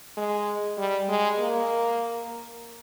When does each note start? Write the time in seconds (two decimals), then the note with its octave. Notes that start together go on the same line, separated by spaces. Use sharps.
0.17 G#3
0.78 G3
1.09 G#3
1.39 A#3